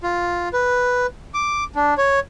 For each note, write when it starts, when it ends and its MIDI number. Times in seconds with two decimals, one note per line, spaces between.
0.03 0.49 65
0.53 1.06 71
1.34 1.64 86
1.75 1.94 62
1.98 2.20 73